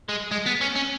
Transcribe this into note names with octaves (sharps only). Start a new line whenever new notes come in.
G#3
G#3
B3
C#4
C#4